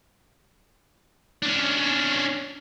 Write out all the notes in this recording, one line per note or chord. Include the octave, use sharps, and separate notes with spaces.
C#4 D4